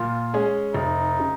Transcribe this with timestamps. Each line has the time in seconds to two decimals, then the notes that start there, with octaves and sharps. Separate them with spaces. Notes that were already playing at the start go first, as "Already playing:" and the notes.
Already playing: A#2 F4
0.34 G#3 C#4 G#4
0.75 F1 D#4
1.20 C#3